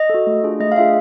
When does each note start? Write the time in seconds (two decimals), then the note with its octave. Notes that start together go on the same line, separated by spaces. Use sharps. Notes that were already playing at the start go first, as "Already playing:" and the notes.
Already playing: D#5
0.10 F#4 A4
0.27 A3
0.44 D4 F4 G#4
0.60 A3 D#5
0.72 F5
0.76 D4 F4 G#4 E5